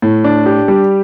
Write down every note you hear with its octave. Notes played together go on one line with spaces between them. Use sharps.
A2
D4
G4
G3